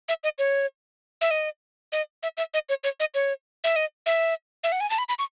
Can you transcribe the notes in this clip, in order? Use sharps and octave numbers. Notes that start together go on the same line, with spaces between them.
E5
D#5
C#5
E5
D#5
D#5
E5
E5
D#5
C#5
C#5
D#5
C#5
E5
D#5
E5
E5
F#5
G#5
A5
B5
B5
C#6